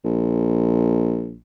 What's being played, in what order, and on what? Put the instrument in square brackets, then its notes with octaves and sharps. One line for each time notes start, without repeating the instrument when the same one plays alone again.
[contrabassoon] A#1